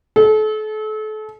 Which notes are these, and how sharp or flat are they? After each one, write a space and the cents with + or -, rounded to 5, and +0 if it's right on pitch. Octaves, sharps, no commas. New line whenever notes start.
A4 -35